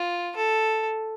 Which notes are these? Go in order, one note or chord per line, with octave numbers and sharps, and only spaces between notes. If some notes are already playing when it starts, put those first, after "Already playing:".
Already playing: F4
A4